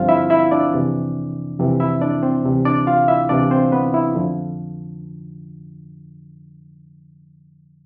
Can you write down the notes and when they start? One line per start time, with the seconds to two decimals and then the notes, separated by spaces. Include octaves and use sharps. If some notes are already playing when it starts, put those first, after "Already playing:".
Already playing: G2 D3 F3 C4 F4 C5 F5
0.09 E4 E5
0.30 E4 E5
0.51 D4 D5
0.73 F2 C3 E3
1.59 F2 C3 E3
1.80 E4 E5
2.02 D4 D5
2.23 C4 C5
2.44 D2 C3 E3
2.65 D4 D5
2.87 F4 F5
3.08 E4 E5
3.29 D2 C3 E3 D4 D5
3.51 C4 C5
3.72 B3 B4
3.94 E4
4.15 F2 D3 F3